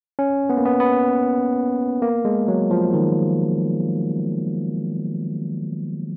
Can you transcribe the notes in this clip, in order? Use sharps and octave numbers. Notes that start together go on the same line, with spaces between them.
C#4
B3
A#3
B3
B3
A#3
G#3
F#3
F3
D#3